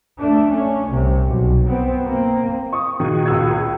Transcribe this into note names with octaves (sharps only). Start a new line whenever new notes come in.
A3 D4
C#4
C2 C3
B1
B3 C4
A#3 C4
C#6 D#6
A#2 D#3 F#4 G#4
C#2 E6 G#6